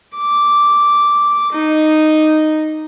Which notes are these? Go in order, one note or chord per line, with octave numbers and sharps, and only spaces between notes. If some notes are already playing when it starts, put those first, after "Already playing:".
D6
D#4